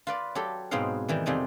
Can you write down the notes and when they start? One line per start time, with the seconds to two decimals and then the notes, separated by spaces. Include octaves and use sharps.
0.07 F4 B4 D5
0.35 F#3 G4 A4
0.71 G#2 B2 F#3 C4 D#4 F5
1.08 D#3 E3 G3
1.26 F2 C3 G3 D#4 G#5